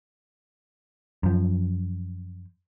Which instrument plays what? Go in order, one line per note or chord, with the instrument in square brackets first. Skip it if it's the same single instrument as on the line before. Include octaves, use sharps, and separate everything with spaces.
[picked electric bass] F#2 F3